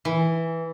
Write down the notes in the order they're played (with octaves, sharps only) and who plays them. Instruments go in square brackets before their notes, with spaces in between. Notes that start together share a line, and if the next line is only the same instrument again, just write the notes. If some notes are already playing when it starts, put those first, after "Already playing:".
[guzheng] E3